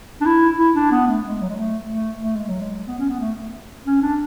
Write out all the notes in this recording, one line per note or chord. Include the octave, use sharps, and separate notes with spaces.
D4
E4
E4
D4
B3
A3
G#3
F#3
G#3
A3
A3
A3
G#3
F#3
G#3
B3
C#4
B3
A3
C#4
D4